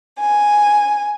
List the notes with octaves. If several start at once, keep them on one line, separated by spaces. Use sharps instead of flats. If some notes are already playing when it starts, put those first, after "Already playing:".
G#5